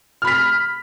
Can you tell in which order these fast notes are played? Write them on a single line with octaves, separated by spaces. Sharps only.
F6 B5 B6